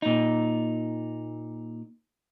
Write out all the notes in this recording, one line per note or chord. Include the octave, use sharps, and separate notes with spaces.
A#2 D#4